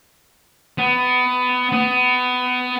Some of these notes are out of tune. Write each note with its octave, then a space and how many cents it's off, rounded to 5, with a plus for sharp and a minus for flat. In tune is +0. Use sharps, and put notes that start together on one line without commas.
B3 +20
B3 +20